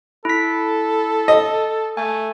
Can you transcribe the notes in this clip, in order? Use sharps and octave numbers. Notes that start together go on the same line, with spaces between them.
E4 A4 B6
D#5
A3 G#5